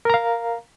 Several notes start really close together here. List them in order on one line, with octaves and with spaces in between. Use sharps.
A#4 A#5 F5